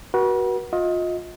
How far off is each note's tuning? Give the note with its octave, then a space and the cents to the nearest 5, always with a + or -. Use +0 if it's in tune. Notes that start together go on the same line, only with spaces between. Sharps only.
F#4 +15 B4 -40
F4 +30 D#5 +25